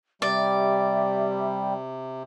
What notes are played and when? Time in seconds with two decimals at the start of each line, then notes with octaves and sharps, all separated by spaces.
0.22 C3 G3 D5 E5